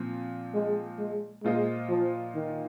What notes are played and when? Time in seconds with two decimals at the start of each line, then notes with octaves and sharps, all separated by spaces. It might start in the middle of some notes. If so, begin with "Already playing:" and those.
Already playing: A#2 F3 C4
0.54 G#3
0.98 G#3
1.43 A#2 G#3 A#3 F4 C5 D#5
1.89 F3
2.35 D#3